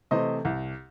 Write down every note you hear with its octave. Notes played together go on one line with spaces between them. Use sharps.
C3 E3 A3 C5 D#5
C2